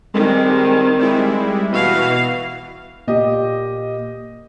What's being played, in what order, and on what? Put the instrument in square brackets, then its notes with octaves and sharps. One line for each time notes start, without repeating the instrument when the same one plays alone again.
[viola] D#3 C4 [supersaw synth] G3 G#3
[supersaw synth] G3 G#3 E4
[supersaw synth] B2 F#4 [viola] E3 F5
[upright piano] A#2 G4 D#5